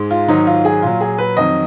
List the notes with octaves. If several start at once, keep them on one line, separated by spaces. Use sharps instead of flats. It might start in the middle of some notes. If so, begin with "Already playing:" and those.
Already playing: G#2 G#3
F4
G#2 D#3 F#3 D#4
F4
G#4
A#2 F#3 F4
G#4
B4
F2 D#3 F#3 D#5